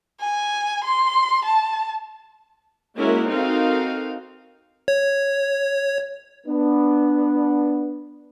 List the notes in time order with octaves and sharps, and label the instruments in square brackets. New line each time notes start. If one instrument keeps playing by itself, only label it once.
[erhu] G#5
C6
A5
[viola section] G#3 A#3 C#4 E4 F#4 A#4
C4 D#4 F#4 A4 A#4 F5
[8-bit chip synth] C#5
[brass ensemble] B3 D4